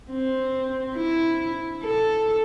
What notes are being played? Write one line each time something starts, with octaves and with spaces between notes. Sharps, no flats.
C4
E4
A4